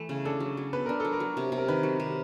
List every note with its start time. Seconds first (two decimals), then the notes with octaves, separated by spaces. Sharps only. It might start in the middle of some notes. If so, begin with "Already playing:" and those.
Already playing: E3 A3
0.09 C#3
0.25 D4 A4
0.40 F#3
0.57 F#3
0.73 B3 B4
0.86 D4 A#4
1.00 F#3 A4
1.13 A#4
1.20 F#3
1.37 C3
1.52 C3
1.58 A#4
1.68 D#3 B4
1.83 F#3
2.00 C3